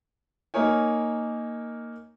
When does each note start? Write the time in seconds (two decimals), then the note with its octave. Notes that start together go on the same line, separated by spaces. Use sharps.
0.54 A#3 D#4 A#4 C#5 G#5